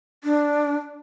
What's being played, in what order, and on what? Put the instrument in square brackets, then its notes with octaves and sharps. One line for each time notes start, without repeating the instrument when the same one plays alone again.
[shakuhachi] D4